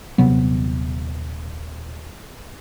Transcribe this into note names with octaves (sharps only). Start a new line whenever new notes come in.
D#1 C3 F#3 B3